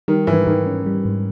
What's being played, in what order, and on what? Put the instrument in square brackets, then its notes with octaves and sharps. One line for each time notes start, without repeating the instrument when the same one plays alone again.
[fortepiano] D#3 [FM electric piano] G3
[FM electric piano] G#2 [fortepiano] E3
[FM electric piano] G#2 [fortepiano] D#3
[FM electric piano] C#4
G3
G#2